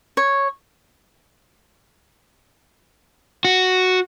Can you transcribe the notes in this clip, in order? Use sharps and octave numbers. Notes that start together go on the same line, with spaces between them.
C#5
F#4